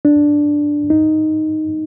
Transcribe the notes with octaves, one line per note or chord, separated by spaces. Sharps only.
D4
D#4